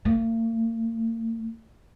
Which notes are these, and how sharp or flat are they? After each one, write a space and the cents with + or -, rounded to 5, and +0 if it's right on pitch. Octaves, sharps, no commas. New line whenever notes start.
A#3 -45